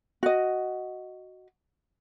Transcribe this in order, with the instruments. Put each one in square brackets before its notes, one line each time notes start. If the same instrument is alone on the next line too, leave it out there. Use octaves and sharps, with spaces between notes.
[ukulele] F#4 D#5